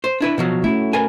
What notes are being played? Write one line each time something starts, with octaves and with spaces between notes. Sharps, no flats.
C5
D4 E4 B4
B2 F3 F#3
A3 C#4 E4 F#4
A#4 B4 G#5